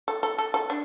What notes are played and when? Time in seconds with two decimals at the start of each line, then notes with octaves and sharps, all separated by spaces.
0.08 A4
0.23 A4
0.38 A4
0.54 A4
0.70 D4